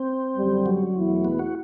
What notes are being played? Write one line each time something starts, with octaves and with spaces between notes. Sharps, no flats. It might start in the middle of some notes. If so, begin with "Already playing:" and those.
Already playing: C4
F#2 D3 G3
F#3
E2 B2 A3 E4
B3
F#4